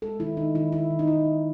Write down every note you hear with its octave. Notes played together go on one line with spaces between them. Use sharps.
G#3 A4
D#3 E4
D#3 D#4
D#3 E4
D#3 E4
D#3
D#4
D#3 E4
D#3